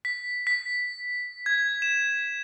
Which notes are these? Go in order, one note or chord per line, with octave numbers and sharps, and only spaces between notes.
B6
B6
G#6
E7